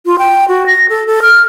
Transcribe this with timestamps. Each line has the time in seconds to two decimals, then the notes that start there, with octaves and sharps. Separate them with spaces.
0.06 F4
0.19 G5
0.48 F#4
0.66 A#6
0.89 A4
1.07 A4
1.22 F6